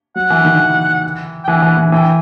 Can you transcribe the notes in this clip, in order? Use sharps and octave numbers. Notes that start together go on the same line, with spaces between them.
F#3 F#5
E3
D#3
E3
G5
E3 F#5
E3
E3
E3 G5